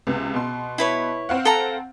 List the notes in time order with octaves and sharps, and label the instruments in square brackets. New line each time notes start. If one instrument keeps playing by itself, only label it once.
[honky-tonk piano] C#2 C3 B3
B2 C6
[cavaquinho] E4 B4 C#5
[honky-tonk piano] C4 F5 F#5
[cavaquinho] A4 A#5